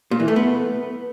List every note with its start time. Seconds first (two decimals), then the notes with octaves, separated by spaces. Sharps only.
0.11 A#2
0.20 E3
0.28 A3
0.36 B3